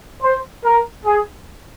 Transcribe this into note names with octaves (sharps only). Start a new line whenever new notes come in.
C5
A#4
G#4